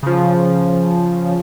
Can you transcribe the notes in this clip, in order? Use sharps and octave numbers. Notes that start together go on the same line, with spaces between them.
C#3 F3